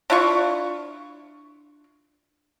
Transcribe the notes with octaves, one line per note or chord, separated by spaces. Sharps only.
D4 E4 F4 C#6